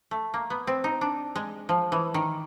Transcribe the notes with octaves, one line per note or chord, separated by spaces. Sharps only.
A3
A#3
B3
C4
D#4
D4
G#3
F3
E3
D#3